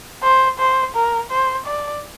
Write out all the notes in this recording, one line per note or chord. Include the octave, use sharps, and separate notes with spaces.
C5
C5
A#4
C5
D5